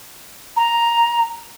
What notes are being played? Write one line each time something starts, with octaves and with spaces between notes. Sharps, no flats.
A#5